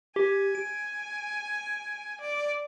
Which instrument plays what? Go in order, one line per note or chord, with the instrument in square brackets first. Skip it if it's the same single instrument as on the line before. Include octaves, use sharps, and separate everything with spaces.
[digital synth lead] G4 [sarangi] G#5
[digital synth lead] D7
[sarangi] D5